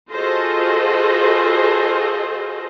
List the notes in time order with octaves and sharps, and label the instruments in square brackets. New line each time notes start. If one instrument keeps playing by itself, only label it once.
[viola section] F4 F#4 G#4 A4 C5 D#5